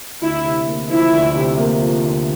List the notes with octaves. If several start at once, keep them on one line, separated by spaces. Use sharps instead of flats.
D2 E4
C3
A#3
F3 E4
D2
C3
A#3
F3
D2